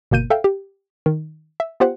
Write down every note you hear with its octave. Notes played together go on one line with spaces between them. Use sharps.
G1 B2 A#3 G6 D#7
A4 E5 F5 G5
G4
D#3
E5
B3 F4 G4 C5 F#5